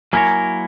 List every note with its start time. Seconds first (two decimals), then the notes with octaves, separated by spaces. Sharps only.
0.13 F#3 A#3 E4 A#4 C#5 G#5